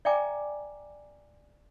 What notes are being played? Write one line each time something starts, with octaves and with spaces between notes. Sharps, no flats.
D5 E5 G5 G#5 A#5 D6